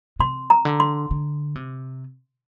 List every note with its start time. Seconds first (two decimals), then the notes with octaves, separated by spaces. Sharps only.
0.19 C3 C6
0.50 A#5
0.65 D3
0.80 C6
1.11 D3
1.55 C3